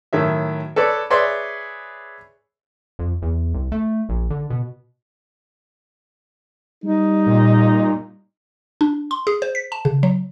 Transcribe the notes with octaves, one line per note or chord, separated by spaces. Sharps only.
A2 D#3 F#3 E5
A4 B4 C#5 D5
G#4 B4 C#5 D5 E5 C6
F2
E2
C2
A3
A#1
D3
B2
G3 D#4
A#2
D4
C6
G#4
C5
B6
A5
C#3
F#3